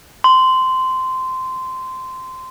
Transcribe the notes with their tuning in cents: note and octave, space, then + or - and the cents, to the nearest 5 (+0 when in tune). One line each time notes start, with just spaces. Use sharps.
C6 -15